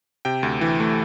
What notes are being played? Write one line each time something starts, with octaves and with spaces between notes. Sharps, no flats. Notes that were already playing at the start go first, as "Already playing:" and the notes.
C3 G5
D2
E3
A3